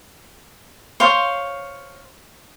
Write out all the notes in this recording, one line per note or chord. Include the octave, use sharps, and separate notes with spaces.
C5 C#5 F5 C6